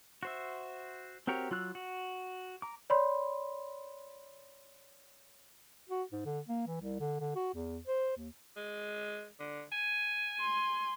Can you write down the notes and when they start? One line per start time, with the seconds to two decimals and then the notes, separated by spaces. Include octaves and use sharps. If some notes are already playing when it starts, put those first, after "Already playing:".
0.23 F#4 C5 E5
1.27 C4 F#4 G4 A#4 C#5
1.51 F#3 F4 E6 F#6
1.75 F#4
2.62 A#5 D6
2.90 C#5 D5 B5 C6
5.89 F#4
6.12 G#2
6.25 D3
6.48 A#3
6.67 E3
6.81 C2
7.00 D3
7.20 D3
7.35 F#4
7.54 E2
7.87 C5
8.17 D#2
8.56 G#3
9.40 D3
9.72 G#5
10.40 C6